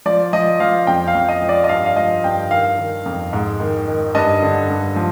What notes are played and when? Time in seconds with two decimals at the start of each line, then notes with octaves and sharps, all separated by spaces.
0.06 F3 D5
0.33 F3 D#5
0.60 F3 F5
0.87 F2 G5
1.08 F5
1.15 F2
1.29 D#5
1.42 F3
1.49 D5
1.64 D#5
1.69 G2 F5
1.86 F5
1.96 F3 D#5
2.24 G2 G5
2.51 D#3 F5
2.78 D#3
3.06 F2
3.33 G#2
3.60 D#3
3.88 D#3
4.15 G2 D#5
4.42 D3
4.69 G2
4.96 F3